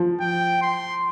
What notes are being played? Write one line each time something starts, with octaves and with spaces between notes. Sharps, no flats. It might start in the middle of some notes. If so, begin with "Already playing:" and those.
Already playing: F3
G5
C6